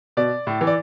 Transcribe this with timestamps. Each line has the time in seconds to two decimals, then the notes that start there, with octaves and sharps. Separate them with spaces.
0.17 B2 D5
0.47 A2
0.61 E3
0.67 D5